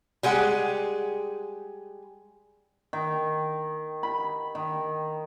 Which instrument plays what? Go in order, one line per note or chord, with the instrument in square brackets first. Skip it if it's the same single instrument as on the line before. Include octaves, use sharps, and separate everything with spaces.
[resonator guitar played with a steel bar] G3 G#3 G#4 F#5 G5
[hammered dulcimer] D#3
B5
D#3